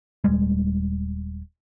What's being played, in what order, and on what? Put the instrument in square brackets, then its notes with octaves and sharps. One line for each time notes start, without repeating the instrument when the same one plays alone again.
[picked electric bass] D#1 G3 G#3